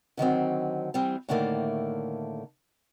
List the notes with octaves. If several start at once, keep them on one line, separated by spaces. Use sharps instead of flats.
D3 D#3 F#3 C4
E3 G3 C4
A2 D3 D#3 A3 A#3